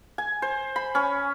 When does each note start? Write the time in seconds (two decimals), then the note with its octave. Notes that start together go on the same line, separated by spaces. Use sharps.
0.18 G#5
0.42 C5
0.76 B5
0.95 C#4